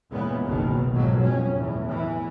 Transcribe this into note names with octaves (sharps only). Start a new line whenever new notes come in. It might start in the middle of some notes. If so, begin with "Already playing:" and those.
E2 A#2 C#3 G#3 B3
F#1 B1 B2 D#3
F2 G#2 B2 F3 F#3
F2 C#4
E2 A2
E3